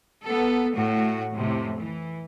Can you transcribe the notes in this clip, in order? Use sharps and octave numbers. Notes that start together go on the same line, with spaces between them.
B3 A4
A2 F#4
F2 A2 C3
E3